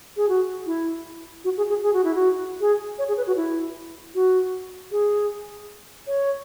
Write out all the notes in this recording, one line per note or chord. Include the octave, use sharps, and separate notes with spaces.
G#4
F#4
E4
F#4
G#4
G#4
G#4
F#4
E4
F#4
G#4
C#5
G#4
B4
F#4
E4
F#4
G#4
C#5